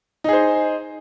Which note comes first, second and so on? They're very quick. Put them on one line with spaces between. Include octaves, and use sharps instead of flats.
D#4 G#4 C5